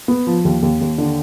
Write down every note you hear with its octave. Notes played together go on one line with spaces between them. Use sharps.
B3
F3
D#2
D#2
D#2
D3